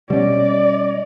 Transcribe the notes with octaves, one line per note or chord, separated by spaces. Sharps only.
B2 G3 C#4 D5 D#5